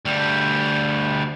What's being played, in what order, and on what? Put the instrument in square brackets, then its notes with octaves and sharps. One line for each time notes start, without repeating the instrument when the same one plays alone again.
[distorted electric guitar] D2 G3